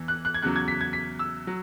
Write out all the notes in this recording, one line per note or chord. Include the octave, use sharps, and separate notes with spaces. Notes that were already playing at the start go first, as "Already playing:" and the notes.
Already playing: E2 E3
F#6
F#6
G#6
E2 C#3 F#3 F#6
G#6
B6
G#6
B6
E6
F#3